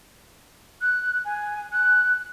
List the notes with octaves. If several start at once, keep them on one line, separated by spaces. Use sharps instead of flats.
F#6
G#5
F#6